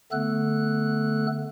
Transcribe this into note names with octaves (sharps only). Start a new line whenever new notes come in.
D3 A3 B3 A4 F#6